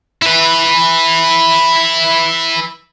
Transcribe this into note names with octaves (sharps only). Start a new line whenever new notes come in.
E4 B4